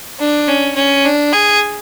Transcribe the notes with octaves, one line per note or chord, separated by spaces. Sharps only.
D4
C#4
C#4
D4
G#4